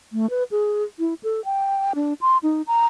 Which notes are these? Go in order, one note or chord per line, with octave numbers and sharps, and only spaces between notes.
A3
B4
G#4
E4
A4
G5
D4
C6
D#4
A#5